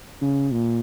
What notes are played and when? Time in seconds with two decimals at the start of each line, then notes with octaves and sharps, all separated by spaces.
0.21 C#3
0.51 A#2